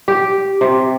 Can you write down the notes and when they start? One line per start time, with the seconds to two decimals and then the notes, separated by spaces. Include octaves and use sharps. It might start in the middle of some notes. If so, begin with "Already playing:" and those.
0.08 G4
0.61 C3